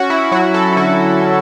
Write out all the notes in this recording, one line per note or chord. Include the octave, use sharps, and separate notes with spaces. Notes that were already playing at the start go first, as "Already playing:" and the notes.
Already playing: C#4 F#4
E4
F#3 F#4
A4
E4
D3 F#4
C#4